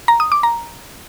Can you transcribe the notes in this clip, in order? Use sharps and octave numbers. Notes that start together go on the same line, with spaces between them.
A#5
D#6
D6
A#5